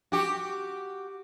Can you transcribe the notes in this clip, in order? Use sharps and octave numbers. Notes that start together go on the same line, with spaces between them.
F#4 G4